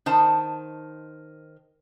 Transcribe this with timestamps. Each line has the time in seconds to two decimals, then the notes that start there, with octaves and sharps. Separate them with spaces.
0.06 D#3 C5 A5